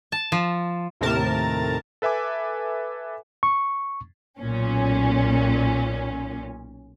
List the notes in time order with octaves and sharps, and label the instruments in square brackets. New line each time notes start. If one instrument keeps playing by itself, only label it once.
[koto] A5
F3
[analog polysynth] D#2 A2 C3 A#4 A5
[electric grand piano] A4 B4 E5 G#5 D6
[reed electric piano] C#6
[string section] B1 A#2 C#4